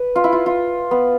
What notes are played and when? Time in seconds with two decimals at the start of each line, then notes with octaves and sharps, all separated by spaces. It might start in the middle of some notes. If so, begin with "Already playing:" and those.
Already playing: B4
0.16 F4
0.24 E4
0.32 F4
0.46 F4
0.91 B3